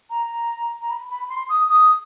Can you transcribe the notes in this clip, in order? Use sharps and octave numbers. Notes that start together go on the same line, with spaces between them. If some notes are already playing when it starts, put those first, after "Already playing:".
A#5
A#5
B5
B5
C6
D#6
D#6